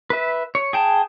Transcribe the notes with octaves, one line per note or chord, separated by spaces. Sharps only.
B4 E5
C#5
G#4 G5 A5